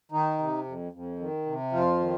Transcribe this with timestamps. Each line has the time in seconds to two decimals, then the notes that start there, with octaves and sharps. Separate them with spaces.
0.12 D#3 D#4
0.38 C3
0.65 F2
0.92 F2
1.19 D#3
1.46 C3
1.72 F2 F3 F4
2.00 D#3